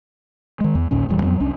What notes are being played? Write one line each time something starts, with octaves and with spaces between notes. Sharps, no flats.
D#3 G#3
E2
A#1 D#2 A#2 C#4
D#1 E2 G3
F2 F#3 B3
C2 C#4 D4